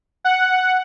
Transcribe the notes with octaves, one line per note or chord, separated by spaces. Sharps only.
F#5